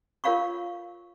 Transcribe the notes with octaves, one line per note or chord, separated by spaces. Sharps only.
F4 A#4 C#5 F5 B5 C#6